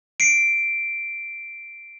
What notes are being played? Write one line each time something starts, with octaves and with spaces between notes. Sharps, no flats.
C7 D7